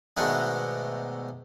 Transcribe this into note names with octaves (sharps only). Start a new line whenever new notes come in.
G#2 B2 D#3 A3 B3 D4